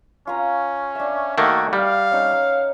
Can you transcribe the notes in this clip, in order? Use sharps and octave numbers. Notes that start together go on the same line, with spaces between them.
C#4 F4 A#5
D4 E5
D#3 A3 A#3 F#4
G3 F5 F#5 A5 D#6
C#4 D#4 C#5